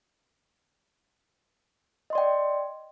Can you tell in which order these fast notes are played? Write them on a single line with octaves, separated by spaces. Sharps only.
D#5 C6 D5 G5